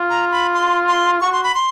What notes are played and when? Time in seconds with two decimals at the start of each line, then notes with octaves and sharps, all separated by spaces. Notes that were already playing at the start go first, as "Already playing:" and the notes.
Already playing: F4
0.10 A#5
0.31 B5
0.54 C6
0.88 C6
1.21 F#4 C#6
1.32 C6
1.43 B5
1.55 C6